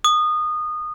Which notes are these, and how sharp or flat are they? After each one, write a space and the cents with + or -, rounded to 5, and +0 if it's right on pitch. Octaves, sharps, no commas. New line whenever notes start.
D#6 -20